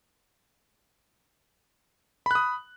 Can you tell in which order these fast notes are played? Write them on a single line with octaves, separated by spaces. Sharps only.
B5 F#6 D#6